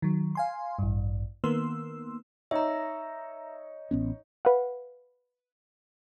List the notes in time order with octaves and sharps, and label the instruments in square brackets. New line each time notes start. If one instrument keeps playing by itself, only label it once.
[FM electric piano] D#3 F#3
F5 G#5 C6
A1 G2
D#3 A#3 B3 C6 E6
[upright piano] D#4 C#5 [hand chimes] E5 A#5
[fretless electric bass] A1 B3 C#4
[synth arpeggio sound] B4 F5 F#5